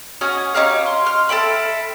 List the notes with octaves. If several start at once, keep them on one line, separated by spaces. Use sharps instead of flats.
C#4 F#4 D#5 G#5
C#4 D#4 G4 F5
C6
C6 F6
A4 E5 G5 B5